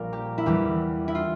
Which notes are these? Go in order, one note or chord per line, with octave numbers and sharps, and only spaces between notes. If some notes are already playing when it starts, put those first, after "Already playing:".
Already playing: A#1 A#2 G3 A#4 D5 F5
G4
E4
E2 E3 G3 G4
E4
F4